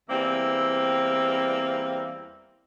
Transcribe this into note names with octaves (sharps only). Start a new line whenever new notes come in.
E2 G3 A#3 C4 E5